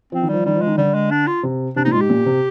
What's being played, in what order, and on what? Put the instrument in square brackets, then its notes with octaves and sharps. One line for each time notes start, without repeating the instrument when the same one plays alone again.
[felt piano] F3 [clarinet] C4
[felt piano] D#3
[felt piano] F3 [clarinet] G3
[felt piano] D#3 [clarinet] G3
[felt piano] F3
[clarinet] G#3
[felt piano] D#3
[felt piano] D3 [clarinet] G3
[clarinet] G#3
D4
F4
[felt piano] C3
[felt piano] C3 [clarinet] D4
[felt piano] A#2 [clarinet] D#4
[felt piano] G#2 [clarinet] F4
[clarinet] G4
[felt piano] A#2
C3